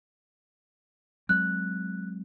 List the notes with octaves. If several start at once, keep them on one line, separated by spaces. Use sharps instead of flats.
F#3 G#3 C4 F#6